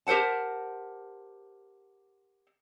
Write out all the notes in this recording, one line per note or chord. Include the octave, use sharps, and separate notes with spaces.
G4 A#4 C5 F#5 A5